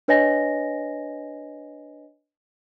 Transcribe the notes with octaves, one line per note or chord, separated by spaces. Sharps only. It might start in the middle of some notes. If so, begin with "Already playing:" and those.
D4 B4 C#5 D#5 G#5 A#6